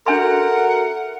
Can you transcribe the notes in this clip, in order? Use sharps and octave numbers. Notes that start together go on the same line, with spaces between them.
D4 F#4 A4 A#4 E5 F#5 G#5 C6